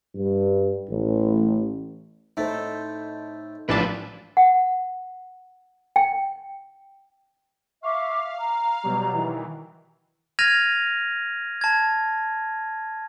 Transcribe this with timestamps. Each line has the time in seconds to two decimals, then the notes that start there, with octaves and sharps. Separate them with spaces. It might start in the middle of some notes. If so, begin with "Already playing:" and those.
0.15 G2
0.90 A1
2.37 A2 A3 D#4 A4 C5
3.69 A1 G#2 F3 D4 F4 B4 E5 A5
4.37 F#5
5.96 G5
7.83 E5 F5 C#6 D6
8.39 A#5
8.83 B2 F#3 G3
9.13 D#3 E3
10.39 F6 G#6 A#6 D#7 F7
11.61 A5 G#6